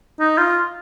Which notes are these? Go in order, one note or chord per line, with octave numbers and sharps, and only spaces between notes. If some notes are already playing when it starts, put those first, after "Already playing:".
D#4
F4